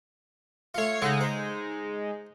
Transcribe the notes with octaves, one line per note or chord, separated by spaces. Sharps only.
A3 F4 C#5 C7 C#7
C#3 G#3 D#4 A4 F#5
C5